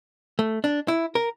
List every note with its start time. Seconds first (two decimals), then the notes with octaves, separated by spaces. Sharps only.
0.39 A3
0.64 D4
0.88 E4
1.15 A#4